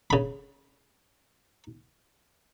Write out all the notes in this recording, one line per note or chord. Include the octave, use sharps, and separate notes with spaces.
C#3 B5